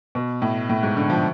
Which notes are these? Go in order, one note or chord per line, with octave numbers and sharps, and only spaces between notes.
B2
A2
A2
G#2
D3
F3